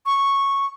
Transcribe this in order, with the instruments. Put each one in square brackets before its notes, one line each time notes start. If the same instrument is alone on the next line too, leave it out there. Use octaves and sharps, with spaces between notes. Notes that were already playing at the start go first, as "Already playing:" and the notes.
[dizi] C#6